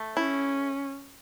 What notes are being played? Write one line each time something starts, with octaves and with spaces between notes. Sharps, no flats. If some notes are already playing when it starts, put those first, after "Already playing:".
Already playing: A3
C#4 E4